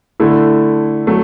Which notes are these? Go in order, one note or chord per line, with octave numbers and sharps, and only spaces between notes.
D3 A3 E4
F#3 A3